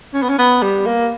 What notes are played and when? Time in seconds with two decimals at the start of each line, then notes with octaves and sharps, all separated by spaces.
0.14 C#4
0.22 B3
0.29 C#4
0.38 B3
0.62 G3
0.86 A#3